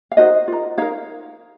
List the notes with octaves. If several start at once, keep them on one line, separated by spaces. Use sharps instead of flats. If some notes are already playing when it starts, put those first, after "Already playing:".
F5
D#4 F#4 A#4 C5 D#5
F4 A#4
D#4 A#4 C#5 F5